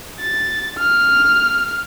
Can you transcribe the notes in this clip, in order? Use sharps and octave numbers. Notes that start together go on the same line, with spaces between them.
A6
F6